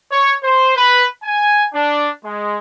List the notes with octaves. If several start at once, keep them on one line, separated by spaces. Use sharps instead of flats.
C#5
C5
B4
G#5
D4
G#3